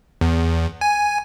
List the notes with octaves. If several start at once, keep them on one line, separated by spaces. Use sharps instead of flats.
E2
G#5